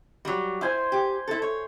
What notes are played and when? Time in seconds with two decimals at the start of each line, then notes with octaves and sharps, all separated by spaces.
0.25 F#3 G3
0.61 E4 C5 G#5
0.92 G4
1.27 E4 A4
1.42 C#5